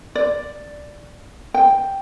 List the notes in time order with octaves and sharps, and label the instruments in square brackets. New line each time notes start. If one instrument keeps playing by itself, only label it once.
[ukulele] D5
G5